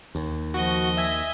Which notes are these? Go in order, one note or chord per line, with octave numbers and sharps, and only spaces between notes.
D#2
F3 F#4 D#5
E5 G#5